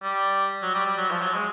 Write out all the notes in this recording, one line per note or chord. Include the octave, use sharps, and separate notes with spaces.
G3
F#3
G3
G3
F#3
F3
F#3
G#3